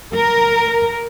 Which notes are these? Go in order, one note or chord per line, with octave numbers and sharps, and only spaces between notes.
A#4